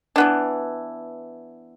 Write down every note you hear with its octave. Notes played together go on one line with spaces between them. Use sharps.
E3 B3 D4